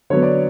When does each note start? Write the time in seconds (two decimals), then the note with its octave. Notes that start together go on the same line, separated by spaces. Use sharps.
0.10 D3 F#3 B3 C#5
0.23 D5